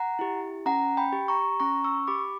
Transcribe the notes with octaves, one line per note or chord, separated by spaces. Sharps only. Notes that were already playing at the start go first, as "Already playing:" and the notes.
Already playing: F#5 A#5
E4 G4
C#4 F#5 A#5
G5 B5
G4
A#5 C#6
C#4 A#5 C#6
C#6 E6
G4 B5 D6